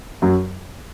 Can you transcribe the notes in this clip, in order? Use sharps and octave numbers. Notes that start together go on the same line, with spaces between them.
F#2 F#3